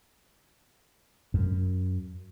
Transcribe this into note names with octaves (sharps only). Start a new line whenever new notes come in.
F#2